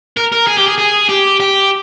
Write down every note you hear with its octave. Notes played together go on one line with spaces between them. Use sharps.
A#4
A#4
G#4
G4
G#4
G#4
G4
G4